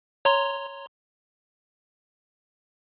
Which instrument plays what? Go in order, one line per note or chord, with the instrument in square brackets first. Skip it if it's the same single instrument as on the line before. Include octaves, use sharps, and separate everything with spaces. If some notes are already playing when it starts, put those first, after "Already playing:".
[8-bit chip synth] C#5 A#5 C6